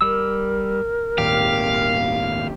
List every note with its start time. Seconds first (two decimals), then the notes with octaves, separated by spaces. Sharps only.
0.01 G3 A#4 E6
1.18 G#1 D#2 A#2 G4 F5